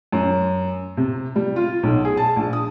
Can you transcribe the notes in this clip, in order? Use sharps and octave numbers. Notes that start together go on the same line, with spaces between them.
F#2
C3
G3
F4
B1
G#4
A5
A#1
D#6